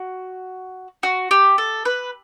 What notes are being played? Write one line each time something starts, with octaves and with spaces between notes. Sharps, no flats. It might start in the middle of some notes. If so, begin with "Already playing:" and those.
Already playing: F#4
F#4
G4
A4
B4